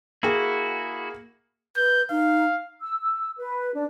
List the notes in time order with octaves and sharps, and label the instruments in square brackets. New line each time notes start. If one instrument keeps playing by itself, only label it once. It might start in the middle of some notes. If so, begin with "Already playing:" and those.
[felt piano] A#3 G#4 [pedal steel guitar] E4 F#4
[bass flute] B4 [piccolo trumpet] G6
[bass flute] D#4 [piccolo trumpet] F5
[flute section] E6
E6
B4
D4